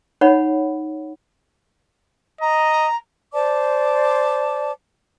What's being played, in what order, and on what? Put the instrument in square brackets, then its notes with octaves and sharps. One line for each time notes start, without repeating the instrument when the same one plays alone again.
[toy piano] D#4 C#5 F#5 B5
[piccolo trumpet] D#5 [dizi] A#5
[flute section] C5 D5 A5 D6